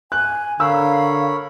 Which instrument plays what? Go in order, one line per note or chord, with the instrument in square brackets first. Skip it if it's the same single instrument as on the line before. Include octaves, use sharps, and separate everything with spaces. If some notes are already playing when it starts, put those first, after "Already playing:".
[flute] G#5 [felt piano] F#6
[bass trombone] D3 [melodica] A#4 C#5 B5 [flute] F5 [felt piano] E6